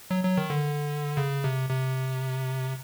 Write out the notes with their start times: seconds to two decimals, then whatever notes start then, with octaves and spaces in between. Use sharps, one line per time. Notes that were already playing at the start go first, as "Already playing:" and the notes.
0.11 F#3
0.24 F#3
0.38 D#3
0.50 D3
1.17 C#3
1.44 C3
1.70 C3